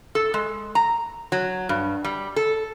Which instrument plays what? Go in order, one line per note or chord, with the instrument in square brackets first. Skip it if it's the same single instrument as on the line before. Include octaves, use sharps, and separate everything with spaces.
[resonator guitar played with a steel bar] A4
G#3
A#5
F#3
G2
G3
A4